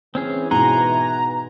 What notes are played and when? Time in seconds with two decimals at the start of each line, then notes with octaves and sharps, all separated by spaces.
0.15 E3 C4 C#4 G#4
0.51 G#2 B2 F#5 G#5 A#5 C6